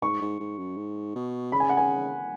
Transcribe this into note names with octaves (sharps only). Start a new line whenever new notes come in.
G#2 C#6
G#2
G#2
F#2
G#2
B2
C#3 B5
G#5
F#5
G#5